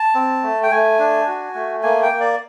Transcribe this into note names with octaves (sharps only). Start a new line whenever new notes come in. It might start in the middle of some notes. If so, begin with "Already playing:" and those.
Already playing: A5
C4
A3
G5
A3 G#5
D4
F#4
A3
A#3 G#5
G5
A#3
D5